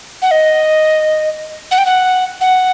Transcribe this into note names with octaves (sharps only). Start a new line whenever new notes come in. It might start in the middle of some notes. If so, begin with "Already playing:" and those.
F#5
D#5
F#5
G5
F#5
F#5